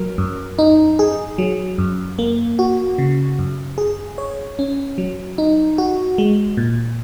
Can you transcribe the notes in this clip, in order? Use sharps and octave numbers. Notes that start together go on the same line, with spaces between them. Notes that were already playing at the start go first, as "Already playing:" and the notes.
Already playing: F#3 A#4
F#2
D#4
G#4
F#3
F#2
A#3
F#4
C#3
F#2
G#4
C#5
C#4
F#3
D#4
F#4
G#3
A#2